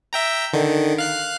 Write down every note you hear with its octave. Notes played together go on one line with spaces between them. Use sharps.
E5 G5 A#5
D3 D#3
F5 F#6 C7